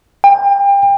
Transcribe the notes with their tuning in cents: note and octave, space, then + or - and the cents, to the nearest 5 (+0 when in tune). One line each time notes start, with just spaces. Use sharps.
G5 +30